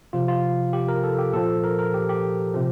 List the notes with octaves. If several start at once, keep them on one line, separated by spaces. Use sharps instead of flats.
C3 F3 F4
F4
G4
A#4
A4
G4
A#2 F3 A4
A#4
A#4
G4
G4
C3 F3